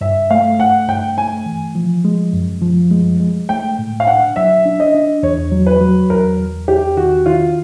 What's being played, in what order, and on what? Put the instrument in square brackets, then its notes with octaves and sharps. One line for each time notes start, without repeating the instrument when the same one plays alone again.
[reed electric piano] G2 [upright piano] E5
[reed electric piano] A3 [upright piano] F5
[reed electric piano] A3 [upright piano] F#5
[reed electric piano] G2 [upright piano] G5
[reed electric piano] A3 [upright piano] G#5
[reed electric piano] E3
F3
G#3
F#2
F3
G#3
G#3
[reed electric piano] A3 [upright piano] G5
[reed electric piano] A2
[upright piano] F5
[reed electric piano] D4 [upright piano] F#5
[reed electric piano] F#3 [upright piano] E5
[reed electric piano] D4
[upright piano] D#5
[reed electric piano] D4
[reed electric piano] E2 [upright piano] C#5
[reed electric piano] F#3
[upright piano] B4
[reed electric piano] F#3
[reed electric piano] E2 [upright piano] A#4
[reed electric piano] E2
[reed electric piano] E2 [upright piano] G4
[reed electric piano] D#3 [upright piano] F#4
[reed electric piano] D#3 [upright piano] F4